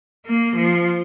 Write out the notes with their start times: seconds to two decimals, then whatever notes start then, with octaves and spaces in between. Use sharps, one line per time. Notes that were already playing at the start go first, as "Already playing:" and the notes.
0.26 A#3
0.56 F3